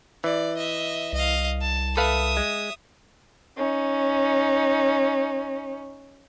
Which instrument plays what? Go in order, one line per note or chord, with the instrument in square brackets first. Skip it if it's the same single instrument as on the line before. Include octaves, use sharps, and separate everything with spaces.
[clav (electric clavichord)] E3 [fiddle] D5
[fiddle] D#5 E5
[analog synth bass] C2 [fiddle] D#5 F5
[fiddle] A5
[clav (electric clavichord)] A4 B4 F5 [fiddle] E5 D#6
[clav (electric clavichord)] G#3
[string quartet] C#4 D#4